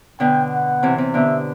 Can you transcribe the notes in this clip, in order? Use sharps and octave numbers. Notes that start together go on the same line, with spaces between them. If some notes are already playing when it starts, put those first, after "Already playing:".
B2 D3 G5
F#5
C3 E3
C3
B2 D3 E5